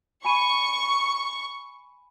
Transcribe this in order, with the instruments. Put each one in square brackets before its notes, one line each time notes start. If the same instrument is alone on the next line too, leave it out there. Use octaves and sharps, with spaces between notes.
[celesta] G#5 B5 D#7 [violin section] C#6